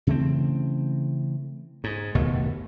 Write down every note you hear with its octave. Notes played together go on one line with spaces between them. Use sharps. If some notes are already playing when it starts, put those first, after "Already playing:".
C#3 E3 A3 C4
G#2
F#1 D#2 B2 A3